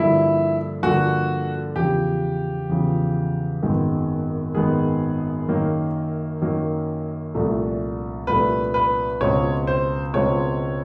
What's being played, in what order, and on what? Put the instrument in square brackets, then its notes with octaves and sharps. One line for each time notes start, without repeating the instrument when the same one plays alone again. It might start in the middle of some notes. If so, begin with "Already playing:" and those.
Already playing: [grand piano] G2 D3 F3 A#3 [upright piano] E4
[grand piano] G2 D3 F3 A#3 [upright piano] F#4
[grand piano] E2 C#3 F3 [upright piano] G4
[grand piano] E2 C#3 F3
G#1 F#2 D#3 G#3 B3
[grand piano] G#1 F#2 D#3 G#3 B3 [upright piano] G#4
[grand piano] F#2 D#3 F#3 A#3
F#2 D#3 F#3 A#3
C2 A#2 F3 A3 D4
[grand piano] C2 A#2 F3 A3 D4 [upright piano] B4
[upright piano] B4
[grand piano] C#2 B2 G#3 C4 F4 [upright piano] C#5
[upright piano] C5
[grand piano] C#2 B2 G#3 C4 F4 [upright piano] C#5